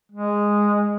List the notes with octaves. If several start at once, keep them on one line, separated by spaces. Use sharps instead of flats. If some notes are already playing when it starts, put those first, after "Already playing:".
G#3